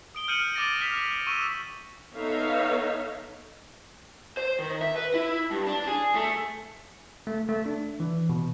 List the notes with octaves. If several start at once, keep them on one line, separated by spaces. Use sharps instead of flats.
D#6 D7 G7
F6 G6 C#7 D#7 E7 F#7
D6 A6 A#6 D7
F6 B6 E7 F7
C#6 E6 D#7
B3 D#4 A4 C#5 E5 F5
C5
D#3
E5
B4
E4
G2
D4
G#4
A3
A3
A3
D4
E3
B2